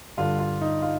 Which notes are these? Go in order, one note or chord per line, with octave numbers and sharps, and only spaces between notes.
G2 D3 F4
F4
D#4
F4